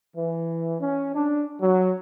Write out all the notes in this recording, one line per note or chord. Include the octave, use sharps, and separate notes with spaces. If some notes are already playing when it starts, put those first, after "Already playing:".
E3
C#4
D4
F#3